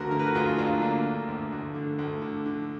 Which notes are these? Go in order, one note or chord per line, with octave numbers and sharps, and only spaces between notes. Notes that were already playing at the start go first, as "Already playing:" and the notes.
Already playing: D2 D3 F#4 A#4
D3 A#4
B4
F#4 A#4
D2 F4 G#4
D2 D4 F4
D3 A#3 D4
D3
D2
D2
D3
D2
D3
D3